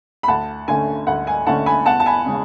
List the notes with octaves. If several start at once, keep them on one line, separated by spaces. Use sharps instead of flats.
B5
D2 F#5 A5
D3 A3 C#4 G#5
D2 F#5
G#5
D3 A3 C#4 F#5 A5
G#5 B5
E2 F#5 A5
A5
G#5 B5
C#3 G#3 C#4